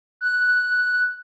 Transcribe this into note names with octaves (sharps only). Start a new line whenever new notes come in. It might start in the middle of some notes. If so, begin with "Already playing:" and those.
F#6